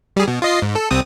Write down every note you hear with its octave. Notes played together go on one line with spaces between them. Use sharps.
G3 G#4
B2
F4 D#5 C7
G#2
A4
C2 C4 D#6